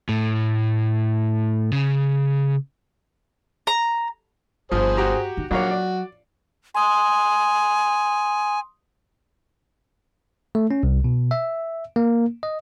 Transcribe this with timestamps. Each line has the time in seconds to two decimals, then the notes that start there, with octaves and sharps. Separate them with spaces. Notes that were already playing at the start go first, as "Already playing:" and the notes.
0.09 A2
1.73 C#3
3.67 A#5
4.72 G1 F3 G#4 C5
4.97 F#4 G4 A#5
5.37 D#3
5.51 A#1 F#3 A#3 F#4 C#5
5.70 D5
6.75 G#5 C6 D#6
10.55 A3
10.71 C#4
10.83 C2
11.04 B2
11.31 E5
11.96 A#3
12.43 D#5